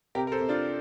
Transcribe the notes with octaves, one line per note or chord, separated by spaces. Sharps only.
C3 G4 A#4
A#4
A4 C5
C3
D4 F4